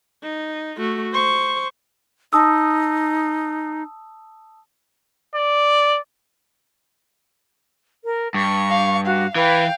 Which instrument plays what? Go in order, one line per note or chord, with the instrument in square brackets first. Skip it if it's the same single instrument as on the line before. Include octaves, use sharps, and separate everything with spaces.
[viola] D#4
A3 F#4
C5 C#6
[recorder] D#4 [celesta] A5 D#6 E6
[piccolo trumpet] D5
[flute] A#4
[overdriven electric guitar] G2 [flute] C#6
[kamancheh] F5
[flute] F#4 [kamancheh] F5
[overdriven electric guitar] E3 [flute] B4 [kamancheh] F5 G5